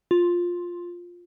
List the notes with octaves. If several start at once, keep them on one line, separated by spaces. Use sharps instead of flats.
F4